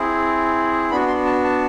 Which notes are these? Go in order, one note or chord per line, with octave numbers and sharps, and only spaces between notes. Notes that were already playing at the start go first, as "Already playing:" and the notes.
Already playing: C4 E4 G#4
B3 D4 F#4 B5
C6
A5
A5